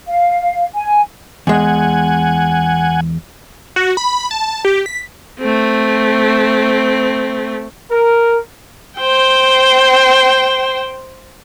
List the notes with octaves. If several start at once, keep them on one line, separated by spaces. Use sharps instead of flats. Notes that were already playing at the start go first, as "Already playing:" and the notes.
F5
G#5
E2 G#3 F#5 G#5
F#4
B5
A5
G4
B6
A3 C4
A#4
C5 G5